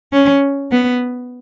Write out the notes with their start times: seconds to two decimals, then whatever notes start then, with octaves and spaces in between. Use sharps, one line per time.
0.13 C#4
0.71 B3